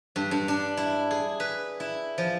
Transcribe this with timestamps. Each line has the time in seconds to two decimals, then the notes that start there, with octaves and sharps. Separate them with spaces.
0.16 G2
0.31 G2
0.48 D4
0.77 E4
1.11 G#4
1.40 B4
1.80 E4
2.18 F3